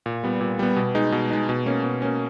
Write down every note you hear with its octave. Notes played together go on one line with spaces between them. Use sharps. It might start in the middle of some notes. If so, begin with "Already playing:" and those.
A#2
G3 B3
A#2
G3 B3
B2
G#3 D#4
B2
G#3 D#4
B2
A#3 C#4
B2
A#3 C#4